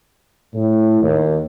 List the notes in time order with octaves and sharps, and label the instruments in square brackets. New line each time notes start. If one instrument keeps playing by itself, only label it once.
[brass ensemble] A2
D#2